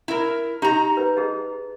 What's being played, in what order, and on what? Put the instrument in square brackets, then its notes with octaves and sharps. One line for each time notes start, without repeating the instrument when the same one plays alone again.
[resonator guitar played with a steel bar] E4 A#4
[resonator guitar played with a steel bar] D#4 A#5 [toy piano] G4
[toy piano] B4
G#4 D#5